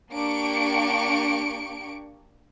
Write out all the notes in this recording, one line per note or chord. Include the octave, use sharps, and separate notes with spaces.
A#3 D4 G4 C#6 C#7 D7